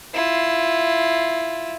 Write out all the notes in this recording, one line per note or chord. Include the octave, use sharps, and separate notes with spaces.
E4 F4